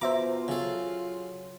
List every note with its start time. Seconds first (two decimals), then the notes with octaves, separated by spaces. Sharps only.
0.01 B2 F4 C5 E5 A#5 D6
0.48 C#3 F#3 A4